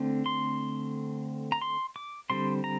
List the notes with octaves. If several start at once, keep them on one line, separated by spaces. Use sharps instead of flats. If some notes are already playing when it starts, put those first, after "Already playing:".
Already playing: D3 A3 C4
C6
A#5
C6
D6
D3 G3 C4 C6
A#5